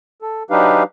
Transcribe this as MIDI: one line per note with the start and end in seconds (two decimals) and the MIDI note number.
0.22 0.43 69
0.50 0.83 54
0.50 0.83 62
0.50 0.83 63
0.50 0.83 67
0.50 0.83 71
0.50 0.83 77